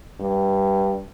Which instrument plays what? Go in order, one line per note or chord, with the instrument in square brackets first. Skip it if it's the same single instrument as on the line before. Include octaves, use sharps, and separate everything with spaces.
[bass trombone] G2